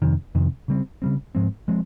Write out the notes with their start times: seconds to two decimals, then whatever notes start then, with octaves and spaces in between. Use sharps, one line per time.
0.02 F2 C3 D#3
0.35 F2 C3 D#3
0.68 C#3 G3 C4
1.02 C#3 G3 C4
1.35 G#2 F3 G#3 C4
1.68 F3 G#3 C4